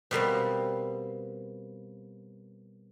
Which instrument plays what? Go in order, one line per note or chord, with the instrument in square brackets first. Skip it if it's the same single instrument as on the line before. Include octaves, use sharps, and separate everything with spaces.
[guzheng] B2 G3 A#3 C4